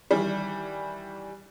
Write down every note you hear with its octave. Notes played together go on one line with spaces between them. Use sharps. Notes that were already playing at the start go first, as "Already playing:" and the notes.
D#3 E3 G3